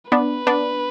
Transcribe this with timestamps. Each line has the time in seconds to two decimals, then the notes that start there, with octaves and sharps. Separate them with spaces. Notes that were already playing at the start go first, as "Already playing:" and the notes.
0.11 B3 D4 B4
0.47 B3 D4